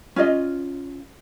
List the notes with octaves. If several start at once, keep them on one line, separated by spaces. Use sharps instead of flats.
C#4 F4 D5 D#5